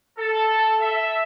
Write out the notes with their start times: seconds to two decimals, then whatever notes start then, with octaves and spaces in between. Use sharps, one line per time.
0.19 A4
0.81 E5